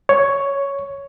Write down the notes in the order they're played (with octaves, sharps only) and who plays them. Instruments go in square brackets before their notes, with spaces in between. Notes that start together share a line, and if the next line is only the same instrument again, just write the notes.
[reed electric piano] C#5